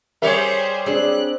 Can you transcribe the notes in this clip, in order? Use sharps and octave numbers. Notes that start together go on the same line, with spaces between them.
G3 G4 G#4 A#4 C5 C#5 E5
C4 D4 G#4 F#6